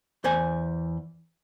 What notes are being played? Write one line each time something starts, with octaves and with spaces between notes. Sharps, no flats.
E2 C5 G#5